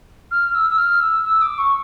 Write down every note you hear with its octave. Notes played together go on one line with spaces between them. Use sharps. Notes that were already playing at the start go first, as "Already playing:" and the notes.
F6
E6
E6
F6
E6
E6
D6
C#6